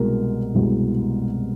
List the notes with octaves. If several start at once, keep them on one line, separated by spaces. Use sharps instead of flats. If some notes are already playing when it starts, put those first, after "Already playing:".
Already playing: C2 B2 G#3 A#4
C2 B2 G#3